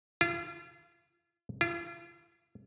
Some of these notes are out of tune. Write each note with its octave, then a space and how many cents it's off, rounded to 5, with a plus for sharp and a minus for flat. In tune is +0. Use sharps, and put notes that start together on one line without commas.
F4 -35
F4 -40